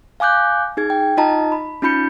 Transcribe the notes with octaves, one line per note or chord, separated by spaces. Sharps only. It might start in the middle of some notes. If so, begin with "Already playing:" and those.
F5 G#5 D6 F#6 G6
D#4 G#4 G#6
G5
D#4 F4 D#5 A5 A#5
B5
C#4 D#4 F4 B5 G6 C#7